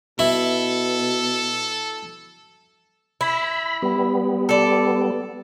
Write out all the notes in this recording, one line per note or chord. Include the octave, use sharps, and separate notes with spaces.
B2 E4 A4
E4 B5
G3 B3
A4 D5